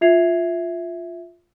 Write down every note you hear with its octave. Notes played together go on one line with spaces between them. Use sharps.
F4 E5 G#6 C7 F7